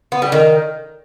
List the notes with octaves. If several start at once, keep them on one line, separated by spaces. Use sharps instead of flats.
B3
G3
D#3